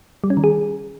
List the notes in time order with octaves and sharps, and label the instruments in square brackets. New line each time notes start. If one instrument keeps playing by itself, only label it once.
[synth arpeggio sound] G3
C#4
D#3
G#4